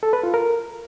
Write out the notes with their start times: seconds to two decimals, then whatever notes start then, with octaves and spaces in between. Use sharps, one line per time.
0.03 A4
0.13 B4
0.23 F4
0.34 A#4